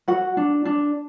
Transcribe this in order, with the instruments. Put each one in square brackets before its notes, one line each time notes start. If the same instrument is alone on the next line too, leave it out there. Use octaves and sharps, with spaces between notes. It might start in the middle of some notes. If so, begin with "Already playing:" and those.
[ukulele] F#4 F#5
D4
D4